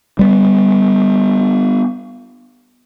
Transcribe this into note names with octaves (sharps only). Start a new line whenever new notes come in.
G3 G#3 B3